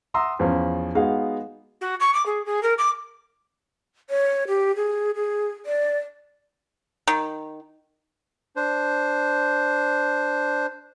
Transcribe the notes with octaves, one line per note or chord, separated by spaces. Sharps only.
E5 F#5 A#5 C6 D#6 E6
E2 F3 C#4 F5
G#3 B3 D#4 F#4 G#4 F5
F#4
C#6
D6
G#4
G#4
A#4
D6
C#5
G4
G#4
G#4
D5
D#3
D4 C5